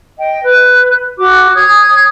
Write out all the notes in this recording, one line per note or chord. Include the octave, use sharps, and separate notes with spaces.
D#5 G5
B4
F#4 D6
C#5 D#6 G6 G#6